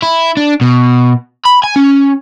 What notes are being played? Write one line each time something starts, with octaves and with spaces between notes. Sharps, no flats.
E4
D4
B2
B5
G#5
C#4